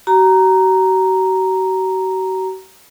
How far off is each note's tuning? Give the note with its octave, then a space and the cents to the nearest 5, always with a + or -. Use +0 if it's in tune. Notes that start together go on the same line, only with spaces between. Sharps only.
F#4 +40 A#5 +0